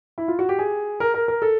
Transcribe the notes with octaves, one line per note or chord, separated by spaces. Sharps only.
E4
F4
F#4
G4
G#4
A#4
A#4
A#4
A4